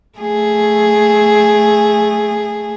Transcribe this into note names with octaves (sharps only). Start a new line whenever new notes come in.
A3 G#4